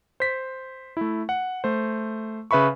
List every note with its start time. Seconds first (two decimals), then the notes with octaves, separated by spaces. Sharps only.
0.20 C5 B6
0.97 A3 E4
1.29 F#5
1.64 A3 C5
2.51 C#3 B4 E5 B5 C#6